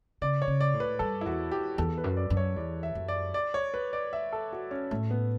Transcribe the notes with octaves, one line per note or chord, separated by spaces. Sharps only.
C#3 D5
C#5
C#3
D5
A2
B4
G2 A4
E4
E2 F#4
G4
E2 A4
B4
F#2
D5
F#2
C#5
E2 D5
E5
F#2
D5
D5
C#5
B4
D5
E5
A4
F#4
C#4
A2 A3
B3